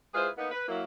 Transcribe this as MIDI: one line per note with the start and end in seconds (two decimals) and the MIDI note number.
0.13 0.29 56
0.13 0.29 64
0.13 0.29 65
0.13 0.29 68
0.13 0.29 71
0.13 0.29 72
0.37 0.49 58
0.37 0.49 59
0.37 0.49 63
0.51 0.63 71
0.68 0.84 54
0.68 0.84 58
0.68 0.84 64